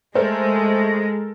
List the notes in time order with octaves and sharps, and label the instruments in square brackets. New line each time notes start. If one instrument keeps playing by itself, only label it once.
[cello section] G#3 [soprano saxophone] A3 [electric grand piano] A4 A#4 [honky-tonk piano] C5